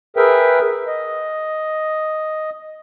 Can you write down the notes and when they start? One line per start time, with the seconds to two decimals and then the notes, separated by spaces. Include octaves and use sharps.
0.17 G#4 A#4 B4 E5 G5
0.87 D#5